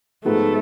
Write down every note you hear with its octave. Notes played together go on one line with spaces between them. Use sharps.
G#2 F3 G#3 A3 B3 F4